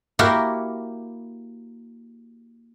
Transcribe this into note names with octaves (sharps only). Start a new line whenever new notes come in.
A#3 E4 F#4 G4 A#4